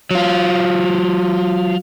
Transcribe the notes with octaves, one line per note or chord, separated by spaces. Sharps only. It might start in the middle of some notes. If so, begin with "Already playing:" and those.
F#3 F4